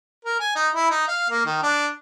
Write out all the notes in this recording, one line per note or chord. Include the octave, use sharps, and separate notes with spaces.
A#4
G#5
D#4
E4
D#4
F5
A#3
D#3
D4